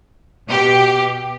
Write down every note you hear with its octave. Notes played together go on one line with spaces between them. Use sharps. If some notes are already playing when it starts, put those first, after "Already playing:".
B2 G4